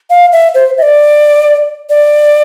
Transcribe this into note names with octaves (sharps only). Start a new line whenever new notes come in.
F5
E5
C5
E5
D5
D5